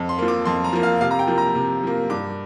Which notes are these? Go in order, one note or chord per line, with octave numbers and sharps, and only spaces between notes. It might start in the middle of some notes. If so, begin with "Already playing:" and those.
Already playing: F2
C6
F3 A#3
D6
F2 C6
A#5
F3 A#3
F5
C3 F5
A#5
G5
F3 A#3
A#5
C3
F3 A#3
G2 D6